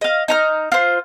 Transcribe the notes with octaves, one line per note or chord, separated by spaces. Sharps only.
D#5 F5
D#4 A#5 F6
F4 C5